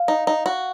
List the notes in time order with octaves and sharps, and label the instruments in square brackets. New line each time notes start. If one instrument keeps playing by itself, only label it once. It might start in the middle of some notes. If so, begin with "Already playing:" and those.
Already playing: [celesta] F5
[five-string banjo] D#4
D#4
F#4